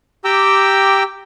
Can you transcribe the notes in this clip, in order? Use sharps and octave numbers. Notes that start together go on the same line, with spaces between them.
G4 G5 A#5 D6 E6